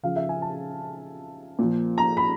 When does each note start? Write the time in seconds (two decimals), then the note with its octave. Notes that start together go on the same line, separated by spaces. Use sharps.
0.03 C#3 F3 F5
0.16 E5
0.29 G#5
0.42 A5
1.59 A#2 F3
1.98 A#5
2.17 B5